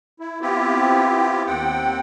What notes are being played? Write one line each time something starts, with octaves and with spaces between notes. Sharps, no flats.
E4
B3 C4 E4 F4 G4
D#2 C4 F#5 G5